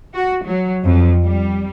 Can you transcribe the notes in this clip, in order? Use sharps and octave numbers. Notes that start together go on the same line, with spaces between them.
F#4
F#3
F2
G3